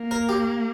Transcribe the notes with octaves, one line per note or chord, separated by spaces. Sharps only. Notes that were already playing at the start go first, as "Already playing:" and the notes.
Already playing: A#3
A#4
G4